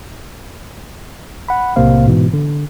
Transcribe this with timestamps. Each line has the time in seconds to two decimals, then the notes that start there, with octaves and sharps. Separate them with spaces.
1.49 F#5 B5
1.76 B1 A2 C3 A#3 C5 F5
2.06 G#2 B2 E3
2.34 D3